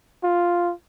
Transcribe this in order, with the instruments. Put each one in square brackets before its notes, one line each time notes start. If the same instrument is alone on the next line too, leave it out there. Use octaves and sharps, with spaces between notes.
[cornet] F4